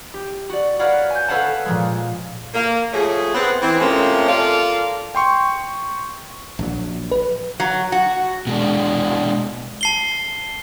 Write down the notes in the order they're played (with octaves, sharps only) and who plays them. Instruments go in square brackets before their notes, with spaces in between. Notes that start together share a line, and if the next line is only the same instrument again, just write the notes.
[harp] G4
F#4 D5
A#4 B4 C#5 D5 F5 F#5
G#5 G6
A4 B4 C#5 F5 F#5 A5
A#2 F3 G#3
[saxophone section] A#3
F3 F#3 A3 G#4
B3 C4
E3 C4
C3 F3 A3 A#3 C4 C#4
F4 A4 A#4 D5 F5
[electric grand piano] G5 C6 C#6
[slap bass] A#1 F#3
[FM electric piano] B4
[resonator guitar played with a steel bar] F#3
F#4
[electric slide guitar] B2 G#3 D4
[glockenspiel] A5 C7 G7